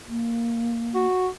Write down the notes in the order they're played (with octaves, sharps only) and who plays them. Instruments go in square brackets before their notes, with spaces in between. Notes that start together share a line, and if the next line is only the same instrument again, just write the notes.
[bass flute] A#3
[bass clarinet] F#4